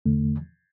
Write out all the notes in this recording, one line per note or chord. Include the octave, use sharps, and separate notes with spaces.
E2 D3 A3